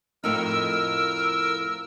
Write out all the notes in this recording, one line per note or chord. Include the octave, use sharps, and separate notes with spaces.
F2 A2 D#4 A#4 E6